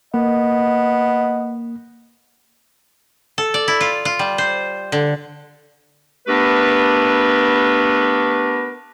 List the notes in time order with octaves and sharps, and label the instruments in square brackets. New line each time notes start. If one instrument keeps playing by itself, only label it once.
[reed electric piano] A#3 [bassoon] B3 [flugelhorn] D#5
[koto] A4
D5
E4
F4
F4
G3
C5
D3
[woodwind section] A3 B3 D4 G4 A#4 B4